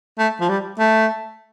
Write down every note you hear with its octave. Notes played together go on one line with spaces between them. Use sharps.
A3
F3
G3
A3